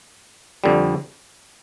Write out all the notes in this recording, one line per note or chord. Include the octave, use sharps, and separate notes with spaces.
F2 D3 G3